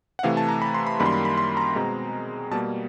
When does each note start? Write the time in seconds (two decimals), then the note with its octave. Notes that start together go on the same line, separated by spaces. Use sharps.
0.19 F#5
0.23 C3 E3 A3 F5
0.37 A5
0.49 A#5
0.62 B5
0.74 C6
0.87 B5
1.00 F#2 D#3 G3 A#3 B5
1.06 C6
1.12 B5
1.25 B5
1.37 C6
1.57 A#5
1.76 B2 G#3 C4
2.51 B2 G3 A#3 A5